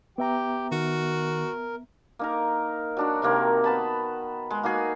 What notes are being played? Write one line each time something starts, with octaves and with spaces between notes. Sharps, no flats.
B3 G4 E5 G5 A#5
D#3 F#4 A#4
A#3 D#4 A#4
F#3 D4 F#4
C3 D#3 A#3 C4
B3 A5 B5
G#3
A#3 D#4 F#4 G#4